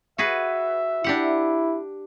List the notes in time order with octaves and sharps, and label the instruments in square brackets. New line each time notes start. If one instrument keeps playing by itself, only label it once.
[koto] F#4 G#4 B4 [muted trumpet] E5
[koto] D4 G4 F#5 [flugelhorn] E4